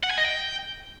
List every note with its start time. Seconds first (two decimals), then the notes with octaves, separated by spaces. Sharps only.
0.03 F#5
0.10 G#5
0.17 D#5
0.25 G5